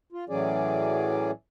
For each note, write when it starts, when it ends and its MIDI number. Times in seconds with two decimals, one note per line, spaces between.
0.12 0.25 65
0.29 1.31 45
0.29 1.31 52
0.29 1.31 54
0.29 1.31 61
0.29 1.31 68
0.29 1.31 74